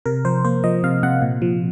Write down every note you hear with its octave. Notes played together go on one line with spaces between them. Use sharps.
C3 A#4
F3 C5
A#3 C5
F3 D#5
C3 F5
C3 F#5
A#2
F3